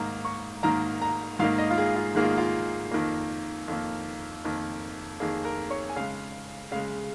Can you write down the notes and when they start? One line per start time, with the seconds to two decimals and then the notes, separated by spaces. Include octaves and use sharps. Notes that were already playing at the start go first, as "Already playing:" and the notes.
Already playing: G#2 D#3 A#3 A#5
0.25 C#6
0.63 G#2 D#3 A#3 A#5
1.02 A#5
1.39 G#2 D#3 A#3 F5
1.59 D#5
1.70 F4
1.78 G#4
1.96 F4
2.15 G#2 D#3 A#3 G#4
2.22 F4
2.37 F4
2.91 F2 D#3 A#3
3.68 F2 D#3 A#3
4.44 F2 D#3 A#3
5.20 F2 D#3 A#3 G#4
5.45 A#4
5.70 C#5
5.89 G#5
5.96 C#3 G#3 F5
6.72 C#3 G#3 F5